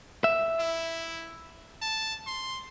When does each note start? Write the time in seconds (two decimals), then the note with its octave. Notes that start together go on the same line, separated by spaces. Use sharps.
0.24 E5
0.59 E4
1.82 A5
2.26 C6